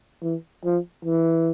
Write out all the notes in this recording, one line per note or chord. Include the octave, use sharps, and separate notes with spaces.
E3
F3
E3